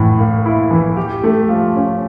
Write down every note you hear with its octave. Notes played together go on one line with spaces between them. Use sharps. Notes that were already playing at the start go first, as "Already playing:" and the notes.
Already playing: A2 E3
A#3
E4
E3
G4
A3
F3
C#4